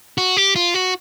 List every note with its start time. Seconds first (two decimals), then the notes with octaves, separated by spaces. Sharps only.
0.18 F#4
0.37 G4
0.56 F4
0.74 F#4